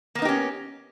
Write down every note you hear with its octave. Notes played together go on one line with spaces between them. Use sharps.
A#3 B3 C#4 D#4 G4